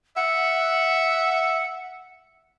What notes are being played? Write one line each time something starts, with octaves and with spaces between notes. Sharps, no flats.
E5 F#5